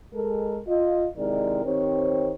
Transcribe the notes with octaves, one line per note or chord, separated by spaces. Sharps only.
G#3 A4 A#4
F4 D#5
C3 D#3 G#3 E4 A#4 D5
D#3 C4 G4 C5 C#5